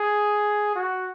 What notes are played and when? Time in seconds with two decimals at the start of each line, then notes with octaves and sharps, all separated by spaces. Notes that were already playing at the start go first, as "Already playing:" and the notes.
Already playing: G#4
0.76 F#4